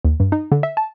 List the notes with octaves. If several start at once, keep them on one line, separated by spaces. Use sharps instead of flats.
D#2
G2
D#4
D3
E5
A5